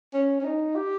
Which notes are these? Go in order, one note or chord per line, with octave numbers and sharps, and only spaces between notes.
C#4
C#4
D#4
G4